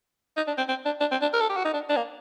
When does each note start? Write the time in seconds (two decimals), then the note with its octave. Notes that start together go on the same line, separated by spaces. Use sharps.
0.37 D#4
0.47 D4
0.58 C4
0.69 C4
0.85 D4
1.01 D4
1.11 C4
1.22 D4
1.33 A#4
1.41 A4
1.49 G4
1.57 F#4
1.64 D#4
1.74 D4
1.90 D4
1.97 A#3